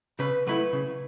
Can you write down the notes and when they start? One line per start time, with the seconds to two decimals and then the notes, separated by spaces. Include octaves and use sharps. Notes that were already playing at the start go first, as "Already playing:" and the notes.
0.19 C#3 B4
0.47 F#3 A3 E4 B4
0.73 C#3